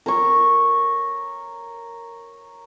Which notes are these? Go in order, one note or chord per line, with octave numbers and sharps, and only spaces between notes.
A#4 C#5 C#6